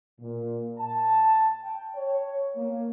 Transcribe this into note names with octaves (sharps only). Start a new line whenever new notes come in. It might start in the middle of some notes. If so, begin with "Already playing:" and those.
A#2
A5
G5
C#5
A#3